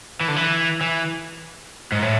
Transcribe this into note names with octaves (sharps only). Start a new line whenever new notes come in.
E3
D3
E3
E3
G#2
A2